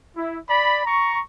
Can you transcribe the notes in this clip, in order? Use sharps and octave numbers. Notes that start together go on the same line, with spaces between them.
E4
D5 B5
A#5 C#6